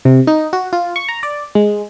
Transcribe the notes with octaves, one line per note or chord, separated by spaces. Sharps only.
C3
D#4
F#4
F4
C#6
A#5
D5
G#3